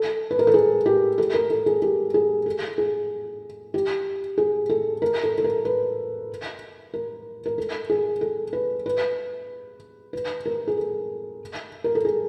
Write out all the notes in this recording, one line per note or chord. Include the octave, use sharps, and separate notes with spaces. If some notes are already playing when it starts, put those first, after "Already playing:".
Already playing: A4
B4
A#4
A4
G#4
G4
A4
A#4
A4
G#4
G4
G#4
A4
G#4
G4
G#4
A4
A#4
A4
A4
A#4
B4
A#4
A#4
A4
G#4
A4
B4
B4
B4
A#4
G#4
A4
A#4
A4
G#4